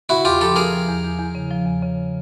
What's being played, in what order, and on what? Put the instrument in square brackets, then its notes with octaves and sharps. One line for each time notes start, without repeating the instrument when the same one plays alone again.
[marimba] C#3 [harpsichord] E4 F#4
[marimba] E2 [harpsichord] F4 G4
[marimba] F3 [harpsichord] G4 A4
[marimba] F3 [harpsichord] G#4 A#4
[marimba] F3
E2
E2
E2
C#3
F3
E2
C#3